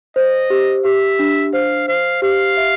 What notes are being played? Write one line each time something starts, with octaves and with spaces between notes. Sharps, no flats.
C5 D#5
G4
G4 E5
D4
C5 F5
C5 F5
G4 F5
E5